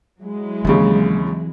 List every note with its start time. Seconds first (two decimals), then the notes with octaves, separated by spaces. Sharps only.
0.20 F#3 G#3 E4
0.65 D#2 C#3 E3 C4